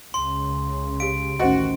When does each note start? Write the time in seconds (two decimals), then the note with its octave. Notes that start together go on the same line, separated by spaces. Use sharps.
0.14 C#2 C#3 C6
1.00 G4 F5 D7
1.39 A1 D2 D#3 C#4 F#4 C5 D#5